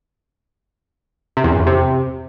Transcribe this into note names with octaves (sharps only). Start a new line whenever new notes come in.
C3
E2
F#2
F2
C3